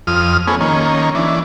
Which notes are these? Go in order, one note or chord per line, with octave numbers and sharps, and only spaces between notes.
F2 D#6 F6
A3 B3 C#4 G#4
D#3 A#3 C#4
E3 D4